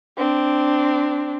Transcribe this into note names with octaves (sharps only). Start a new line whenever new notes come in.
C4 D4